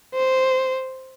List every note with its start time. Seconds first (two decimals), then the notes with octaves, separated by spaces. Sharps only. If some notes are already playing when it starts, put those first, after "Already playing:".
0.14 C5